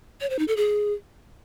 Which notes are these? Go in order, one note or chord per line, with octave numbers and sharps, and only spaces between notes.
C#5
C5
D#4
A4
G#4